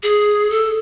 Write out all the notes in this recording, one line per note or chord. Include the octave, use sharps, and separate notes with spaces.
G#4
A4